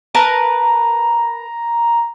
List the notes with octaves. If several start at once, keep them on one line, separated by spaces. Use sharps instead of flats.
A#4 B4 A5 A#5